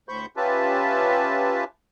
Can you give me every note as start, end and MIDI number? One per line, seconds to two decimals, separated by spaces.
0.09 0.26 38
0.09 0.26 45
0.09 0.26 72
0.09 0.26 83
0.09 0.26 85
0.09 0.26 91
0.37 1.64 61
0.37 1.64 65
0.37 1.64 67
0.37 1.64 71
0.37 1.64 76
0.37 1.64 81